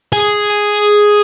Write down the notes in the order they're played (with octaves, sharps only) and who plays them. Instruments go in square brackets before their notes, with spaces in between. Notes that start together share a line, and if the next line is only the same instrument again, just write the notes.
[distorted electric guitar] G#4